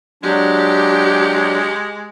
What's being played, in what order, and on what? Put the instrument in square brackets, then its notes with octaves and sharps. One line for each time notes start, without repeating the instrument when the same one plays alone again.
[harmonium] F#3 D4 [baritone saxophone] G#3 [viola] G4